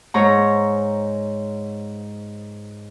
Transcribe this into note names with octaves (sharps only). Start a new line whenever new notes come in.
G#2 C#5 A#5